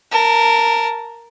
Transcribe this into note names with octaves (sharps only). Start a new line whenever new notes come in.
A#4 A5